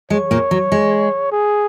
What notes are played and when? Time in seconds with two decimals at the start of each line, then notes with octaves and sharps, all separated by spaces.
0.10 G#3 C#5
0.31 A#2 A#3
0.51 F#3
0.72 G#3
1.32 G#4